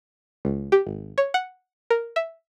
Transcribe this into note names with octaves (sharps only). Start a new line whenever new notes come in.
C#2
G4
G#1
C#5
F#5
A#4
E5